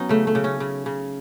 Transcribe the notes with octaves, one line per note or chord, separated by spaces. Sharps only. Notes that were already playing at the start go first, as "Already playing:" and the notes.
Already playing: F#3 B3 C#4 D#4
C#3 A3
A3
C#3
C#4
C#3
C#3